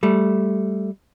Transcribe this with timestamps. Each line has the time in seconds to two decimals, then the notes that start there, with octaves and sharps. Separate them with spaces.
0.03 G3 A3